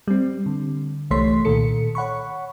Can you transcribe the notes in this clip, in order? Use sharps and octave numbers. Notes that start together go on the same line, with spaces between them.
G3 C4
D3
C2 E3 A3 C#5 C6 B6
A#2 D#3 A4 C#7
C#5 F#5 B5 C#6